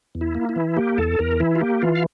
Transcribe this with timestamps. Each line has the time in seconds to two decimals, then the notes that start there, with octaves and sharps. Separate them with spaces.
0.15 E2
0.21 E4
0.35 A#3
0.49 E4
0.56 E3
0.77 A#3 G4
0.98 E2 A4
1.19 E2 A#4
1.40 E3 E4
1.56 F4
1.61 A#3 G4
1.82 E3 F4
1.95 F5